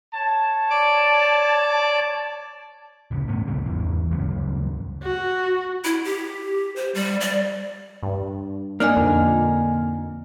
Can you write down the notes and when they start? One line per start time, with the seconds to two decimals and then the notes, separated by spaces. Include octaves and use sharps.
0.15 C#5 A5
0.70 D5 D6
3.11 D1 A1 C#3
3.28 G2 A3 B3 C#4
3.47 D2 A#2 C#3 G3
3.66 G#1 E2 E3
4.11 D2 G2 C#3 F#3
5.03 F#4
5.84 E4
6.04 G4
6.76 C5
6.95 G3
7.21 D5
8.03 G2
8.80 A#3 D4 D#4 G#5 F6
8.97 F2 A#2 D3